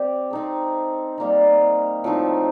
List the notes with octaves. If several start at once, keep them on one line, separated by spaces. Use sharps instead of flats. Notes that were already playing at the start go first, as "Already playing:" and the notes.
Already playing: C4 G4 D5
C4 D#4 A4
G3 A#3 D#4
A2 F3 C4 D#4